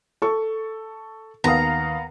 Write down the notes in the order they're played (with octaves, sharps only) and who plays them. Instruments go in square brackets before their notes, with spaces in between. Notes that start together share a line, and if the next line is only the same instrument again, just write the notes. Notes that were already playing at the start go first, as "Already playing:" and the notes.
[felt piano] A4 C#6
[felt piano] D#2 D#6 [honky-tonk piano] B3 F5 [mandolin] A#5